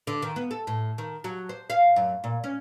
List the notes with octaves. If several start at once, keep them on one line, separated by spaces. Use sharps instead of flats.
D3
D#3
B3
A4
A2
D#3
F#3
C5
F5
F#2
A#2
C#4